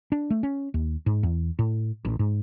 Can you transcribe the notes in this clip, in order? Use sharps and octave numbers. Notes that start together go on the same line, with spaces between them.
D4
A3
C#4
D#2
G#2
E2
A2
A1
G#2